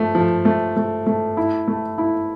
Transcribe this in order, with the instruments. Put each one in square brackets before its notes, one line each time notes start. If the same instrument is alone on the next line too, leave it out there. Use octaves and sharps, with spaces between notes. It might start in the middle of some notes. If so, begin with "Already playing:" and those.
Already playing: [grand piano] F3 A3
F3
A3
A3
A3
E4
A3
E4